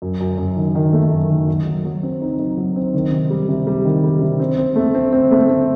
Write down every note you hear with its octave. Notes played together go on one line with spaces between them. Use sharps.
F#2
F#2
F#2
D#3
D#3
A3
F#2
D#3
F#3
F#3
F#3
C4
D#4
D#4
F#3
C4
D#3
C3
G3
C3
G3
D#3
G3
C3
C4
C4
A3
C4
C4
A3
C4